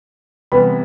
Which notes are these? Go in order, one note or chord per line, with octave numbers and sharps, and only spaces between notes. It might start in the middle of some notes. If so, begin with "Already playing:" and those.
C3 E3 G3 B3 B5